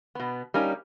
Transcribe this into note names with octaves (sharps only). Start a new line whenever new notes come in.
B2 B3
G3 A#3 C#4 D#4